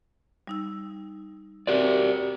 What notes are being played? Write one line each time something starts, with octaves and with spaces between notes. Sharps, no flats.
G3 D#4 E6
C4 F#4 G4 A#4 D5